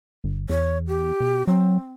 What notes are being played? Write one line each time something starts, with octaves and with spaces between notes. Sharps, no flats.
G1
E2 C#5
G4
B2
F#3 C4